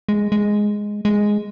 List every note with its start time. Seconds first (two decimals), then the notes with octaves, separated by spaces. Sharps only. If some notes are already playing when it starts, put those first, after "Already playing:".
0.09 G#3
0.32 G#3
1.05 G#3